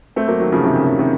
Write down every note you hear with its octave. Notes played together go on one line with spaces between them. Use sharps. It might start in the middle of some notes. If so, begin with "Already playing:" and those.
A3 C4
F#3 A#3
D#3 F#3
C#3 F3
C3 D#3
C#3
C3
C#3
C3 D#3